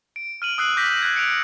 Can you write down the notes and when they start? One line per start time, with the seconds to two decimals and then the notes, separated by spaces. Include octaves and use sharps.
0.16 D7
0.42 F6 D#7 F#7
0.58 D#6 E6 F#6 C7 D#7 F#7
0.77 D6 G6 A#6 B6
1.02 F#6 G#6
1.15 F#6 C#7 D7 F7